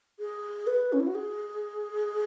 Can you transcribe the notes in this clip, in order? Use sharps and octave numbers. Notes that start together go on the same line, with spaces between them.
G#4
B4
C#4
E4
F#4
G#4